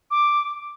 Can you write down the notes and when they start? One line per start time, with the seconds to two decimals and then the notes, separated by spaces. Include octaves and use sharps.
0.11 D6